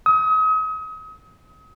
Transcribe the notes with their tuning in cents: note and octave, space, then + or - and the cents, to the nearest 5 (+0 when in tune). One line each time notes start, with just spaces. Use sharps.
D#6 +35